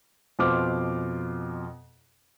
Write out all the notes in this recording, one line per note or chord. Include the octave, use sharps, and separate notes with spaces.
F2 B2 F4 C5 D6 F6